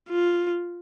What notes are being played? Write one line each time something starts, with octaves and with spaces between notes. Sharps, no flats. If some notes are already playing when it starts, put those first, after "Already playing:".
F4